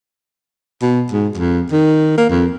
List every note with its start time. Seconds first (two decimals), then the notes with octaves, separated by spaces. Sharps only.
0.82 B2
1.12 G#2
1.37 F2
1.72 D#3
2.17 A#3
2.30 F2